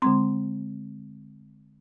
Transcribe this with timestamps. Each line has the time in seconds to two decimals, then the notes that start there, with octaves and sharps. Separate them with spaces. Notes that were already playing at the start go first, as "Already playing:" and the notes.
0.02 D3 G#3 C4 C6